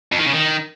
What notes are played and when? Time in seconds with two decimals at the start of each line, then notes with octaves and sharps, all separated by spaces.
0.12 F2
0.19 D#3
0.26 C#3
0.33 D#3